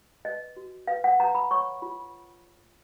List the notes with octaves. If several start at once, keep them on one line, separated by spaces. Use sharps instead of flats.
B4 D#5
F#4
B4 F5
F#5
B4 A#5
B5
C#5 C#6
F4